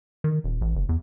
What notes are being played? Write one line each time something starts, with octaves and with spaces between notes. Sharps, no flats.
D#3
D#1
A1
F#1
E2